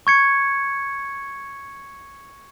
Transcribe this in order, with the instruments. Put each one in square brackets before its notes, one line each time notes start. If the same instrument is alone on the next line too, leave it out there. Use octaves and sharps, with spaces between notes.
[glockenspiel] C#6 G#6 C#7